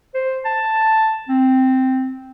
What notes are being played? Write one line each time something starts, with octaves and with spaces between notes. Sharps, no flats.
C5
A5
C4